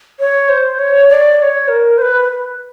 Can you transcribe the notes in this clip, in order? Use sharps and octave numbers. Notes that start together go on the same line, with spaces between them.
C#5
C5
C#5
D5
D5
C#5
A#4
C5
B4